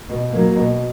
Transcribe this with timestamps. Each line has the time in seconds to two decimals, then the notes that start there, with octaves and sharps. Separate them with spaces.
0.09 B2
0.32 F#3 A#3
0.56 B2